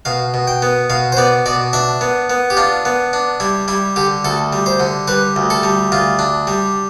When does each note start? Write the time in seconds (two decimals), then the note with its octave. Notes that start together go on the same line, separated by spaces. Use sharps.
0.05 B2 F5
0.34 B2
0.48 G5
0.62 B3
0.90 B2 F5
1.12 C5
1.17 B3 D5
1.46 B2 D5
1.73 D4 E5
2.01 B3
2.30 B3
2.50 G4
2.57 D4 F4
2.85 B3
3.13 D4
3.40 G3 E4
3.68 G3 E4
3.96 D3 G4
4.25 D2 A4
4.53 G3
4.66 C5
4.80 D3
5.08 G3 B4
5.36 D2
5.50 A4
5.63 G3
5.92 D2 F4
6.19 D4
6.47 G3